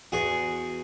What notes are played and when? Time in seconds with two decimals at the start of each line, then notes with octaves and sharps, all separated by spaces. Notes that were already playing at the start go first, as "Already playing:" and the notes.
0.12 E2 F#4 G#4 F#5 G#5 C#6